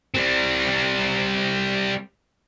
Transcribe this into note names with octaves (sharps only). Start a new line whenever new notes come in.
G3 C4